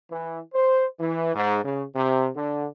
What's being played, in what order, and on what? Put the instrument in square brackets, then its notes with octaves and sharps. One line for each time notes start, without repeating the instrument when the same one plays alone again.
[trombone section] E3
C5
E3
G#2
C#3
C3
D3